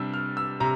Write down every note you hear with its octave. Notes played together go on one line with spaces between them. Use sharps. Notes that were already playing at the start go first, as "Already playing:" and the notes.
Already playing: C3 G3 D4 E6
F6
E6
C3 A#5